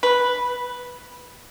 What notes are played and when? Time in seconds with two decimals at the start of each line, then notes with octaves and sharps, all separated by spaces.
0.03 B4